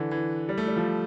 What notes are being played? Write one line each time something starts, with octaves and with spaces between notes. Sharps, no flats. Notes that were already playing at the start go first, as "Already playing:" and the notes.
Already playing: D3 E3
E3
G3
A3
G3
F3